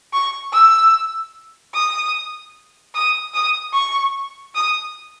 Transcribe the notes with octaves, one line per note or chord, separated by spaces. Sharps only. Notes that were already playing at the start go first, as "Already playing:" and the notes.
C#6
E6
D#6
D#6
D#6
C#6
D#6